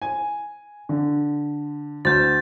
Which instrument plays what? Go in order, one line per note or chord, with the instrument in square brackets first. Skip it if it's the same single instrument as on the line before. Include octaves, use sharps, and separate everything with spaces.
[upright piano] G#5
D3
[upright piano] D2 [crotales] G6 A6